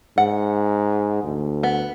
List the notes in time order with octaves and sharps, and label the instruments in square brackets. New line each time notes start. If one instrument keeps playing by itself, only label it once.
[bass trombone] G#2 [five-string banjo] F#5
[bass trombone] D2
[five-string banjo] B3